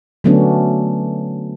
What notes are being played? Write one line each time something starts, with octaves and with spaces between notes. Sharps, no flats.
D3 F#3 A3 B3 C#4 D4